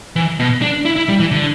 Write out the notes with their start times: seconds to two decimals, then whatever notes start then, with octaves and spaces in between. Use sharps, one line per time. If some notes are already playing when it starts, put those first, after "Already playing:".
0.16 E3
0.40 B2
0.62 D4
0.85 E4
0.96 E4
1.08 G3
1.20 E3
1.32 D3